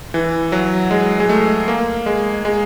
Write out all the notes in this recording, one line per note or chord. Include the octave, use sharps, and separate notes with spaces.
E3
F#3
G#3
G#3
A3
A#3
G#3
G#3